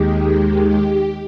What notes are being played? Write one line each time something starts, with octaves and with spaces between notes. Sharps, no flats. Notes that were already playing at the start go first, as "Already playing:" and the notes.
Already playing: D#2 D#3 G#3 G4
G4